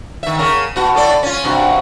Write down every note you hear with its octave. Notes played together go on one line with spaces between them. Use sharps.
D#3 E5
C#3 A#4
B2 F#4
A2 A4 D5
C#4 F4
G2 C3 F#4